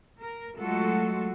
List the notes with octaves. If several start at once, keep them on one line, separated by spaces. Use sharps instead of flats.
A#4
F#3 G#3 A3 F4 F#4 A4